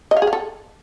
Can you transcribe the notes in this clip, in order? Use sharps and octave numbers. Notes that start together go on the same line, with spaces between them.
D#5
F5
G#4
F5
A4